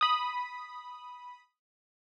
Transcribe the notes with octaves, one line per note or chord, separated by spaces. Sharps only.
B5 D#6